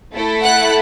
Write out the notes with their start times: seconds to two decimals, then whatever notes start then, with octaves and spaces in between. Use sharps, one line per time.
0.13 A3 E4 A4
0.42 F#5 F#6